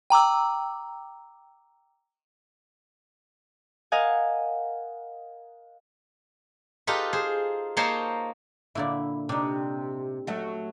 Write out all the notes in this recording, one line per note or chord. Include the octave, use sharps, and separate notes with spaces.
G5 A#5 D6 E6
A#4 D#5 F5 F#5 G#5
D#4 F4 G4 A4 B4
G#4 C5
A#3 D#4 C5 C#5 A5 C6
A#2 D3 E4 D5
C3 D4 D#4
F#3 A3 F#4